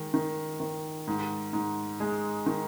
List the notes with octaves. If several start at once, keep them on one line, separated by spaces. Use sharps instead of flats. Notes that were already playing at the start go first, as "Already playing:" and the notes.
Already playing: D#3 G#3
D#3
D#3
G#2
G#2
G#3
D#3